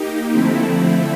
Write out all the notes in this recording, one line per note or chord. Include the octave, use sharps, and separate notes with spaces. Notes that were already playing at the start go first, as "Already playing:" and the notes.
Already playing: A#3 D#4 G4
D3 F3 A3 C4 E4